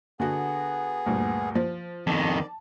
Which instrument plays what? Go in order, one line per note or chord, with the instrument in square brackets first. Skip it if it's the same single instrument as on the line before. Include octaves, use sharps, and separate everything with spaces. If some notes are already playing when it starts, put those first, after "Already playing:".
[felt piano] D3 F#4 [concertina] B3 G#4
[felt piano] D2 G2 A#2
F3
[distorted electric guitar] F2 D#3 [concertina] D5 [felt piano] A5